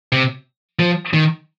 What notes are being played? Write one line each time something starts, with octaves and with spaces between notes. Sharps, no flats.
C3
F3
D#3